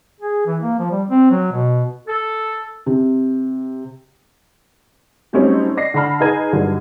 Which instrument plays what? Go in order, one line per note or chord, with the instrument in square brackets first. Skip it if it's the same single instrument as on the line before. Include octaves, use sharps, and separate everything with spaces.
[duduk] G#4
E3
A#3
F3
G3
C4
F#3
B2
[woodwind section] A4
[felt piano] C3
[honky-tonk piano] F#3 G3 A3 C4 C#4 D#4
D5 D#5 A#6 C7
D3 D5 A5 B5 F6
D#4 G#4 B4 A#5 G#6 D#7
G2 D3 D#3 F#3 G3